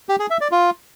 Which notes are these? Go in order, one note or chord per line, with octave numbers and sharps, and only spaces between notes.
G4
G#4
E5
D5
F4